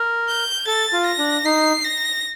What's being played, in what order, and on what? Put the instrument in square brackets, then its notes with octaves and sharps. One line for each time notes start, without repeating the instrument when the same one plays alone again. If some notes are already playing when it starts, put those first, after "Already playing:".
Already playing: [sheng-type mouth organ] A#4
[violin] G6
[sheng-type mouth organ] A4 [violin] A6
[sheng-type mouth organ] F4
[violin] A#6
[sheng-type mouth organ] D4
[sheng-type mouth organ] D#4 [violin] C7
[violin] A#6